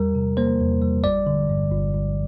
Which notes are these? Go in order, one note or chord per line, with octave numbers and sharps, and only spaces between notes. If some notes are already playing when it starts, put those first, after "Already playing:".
Already playing: E2 G3 A#4
C3
A#3 C5
E2
G3
G1 D5
D3
G2
G1
G1